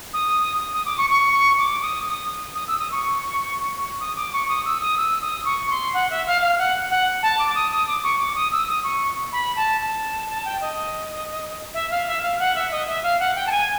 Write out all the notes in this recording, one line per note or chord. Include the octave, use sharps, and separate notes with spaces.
D#6
D#6
D6
C#6
C#6
D6
D#6
D#6
D#6
E6
D#6
C#6
D#6
D6
C#6
D#6
E6
D#6
E6
D#6
C#6
C6
F#5
E5
F5
F5
F#5
F#5
A5
D6
D#6
D#6
D6
C#6
D6
D#6
E6
D#6
C#6
B5
A5
A5
A5
G5
D#5
E5
F5
E5
F5
F#5
E5
D#5
E5
F5
F#5
G5
A5
G#5